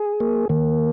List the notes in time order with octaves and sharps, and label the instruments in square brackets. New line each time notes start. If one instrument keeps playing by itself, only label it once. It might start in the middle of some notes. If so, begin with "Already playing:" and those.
Already playing: [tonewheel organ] G#4
A#3
[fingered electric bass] D#3 [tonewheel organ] A#3